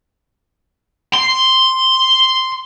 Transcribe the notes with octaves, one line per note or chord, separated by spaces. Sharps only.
C6